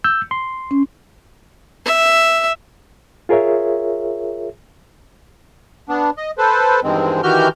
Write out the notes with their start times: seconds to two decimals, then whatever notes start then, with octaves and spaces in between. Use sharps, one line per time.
0.04 E6 G6
0.31 C6
0.71 C#4
1.86 E5
3.29 F4 G#4 A#4 C#5 E5
5.87 B3 D4
6.17 D#5
6.38 A4 B4 C5
6.83 E2 G2 D#3 G#3 C4
7.23 D#3 E3 F#4 G4 F6 G6